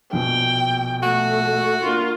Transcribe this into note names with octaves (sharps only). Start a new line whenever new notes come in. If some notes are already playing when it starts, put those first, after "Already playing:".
A#1 B2 G5
A3 F#4
A#3 D4 F4 A#4